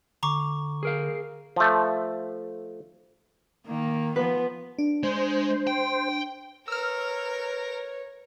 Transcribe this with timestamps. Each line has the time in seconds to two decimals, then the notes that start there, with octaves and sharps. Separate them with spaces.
0.23 D3 A#5 C#6 D6
0.83 G#4 A#4 F5
1.56 F3 A3
3.67 D#3 A#3
4.16 F3 B3 B4
4.78 D4
5.03 G#3 C5
5.67 G5
6.68 A#4 B4 C#5 E6 F6